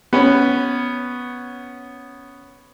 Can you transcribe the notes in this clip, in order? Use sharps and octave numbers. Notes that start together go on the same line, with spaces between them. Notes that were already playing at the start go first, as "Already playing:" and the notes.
B3 C#4